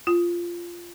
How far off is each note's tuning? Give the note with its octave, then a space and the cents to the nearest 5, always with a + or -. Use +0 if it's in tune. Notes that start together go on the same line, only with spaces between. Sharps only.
F4 -10